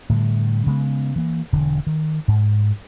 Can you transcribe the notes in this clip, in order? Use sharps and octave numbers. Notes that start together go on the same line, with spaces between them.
A2 D3 G3
C#3 G#3 B3
E3 A#3
E1 D3
D#3
G#2